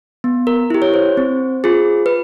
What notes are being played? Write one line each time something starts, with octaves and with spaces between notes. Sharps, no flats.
B3
A#4
E4 G4
C#5
C5
C4
F4 G#4
B4